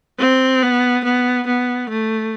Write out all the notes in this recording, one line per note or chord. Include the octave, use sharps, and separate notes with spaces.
C4
B3
B3
B3
A3